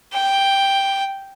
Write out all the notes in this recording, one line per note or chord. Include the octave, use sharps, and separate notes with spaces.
G5